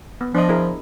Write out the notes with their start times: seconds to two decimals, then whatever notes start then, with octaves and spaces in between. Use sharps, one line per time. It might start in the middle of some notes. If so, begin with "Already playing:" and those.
0.21 B3
0.35 F3 D4 D#5
0.49 E4 G#4 A#4